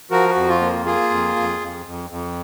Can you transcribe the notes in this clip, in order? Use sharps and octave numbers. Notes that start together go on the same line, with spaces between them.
F3 F#4 A#4
F#4
F2
F4
A#3
A#3 F4 G#4
F2
F2
F2
F2
F2